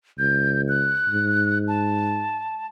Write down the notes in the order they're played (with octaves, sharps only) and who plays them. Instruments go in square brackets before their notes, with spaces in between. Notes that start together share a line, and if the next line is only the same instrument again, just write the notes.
[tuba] C#2 [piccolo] G6
[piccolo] F#6
[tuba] G#2
[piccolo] A5